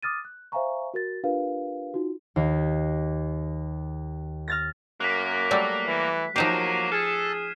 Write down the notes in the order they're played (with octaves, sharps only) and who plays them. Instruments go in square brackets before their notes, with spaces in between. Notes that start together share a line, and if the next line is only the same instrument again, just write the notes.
[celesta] D6 D#6 F6 A6 D#7
F#6
C5 E5 F5 G#5 A#5 C#6
F#4 A#4 A6
D4 F4 G4 A#4 B4 F5
D#4 F4 F#4
[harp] D#2
F6 A6 A#6
[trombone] F#2 [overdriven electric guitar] A#3 [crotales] F#6 B6
[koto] F#3 G3 A3
[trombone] E3
[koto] F3 D#4 G4 [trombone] F#3 [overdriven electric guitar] A#3 [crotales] C7 D#7 E7
[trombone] G#4 [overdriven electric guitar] A4 [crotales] F6 G#6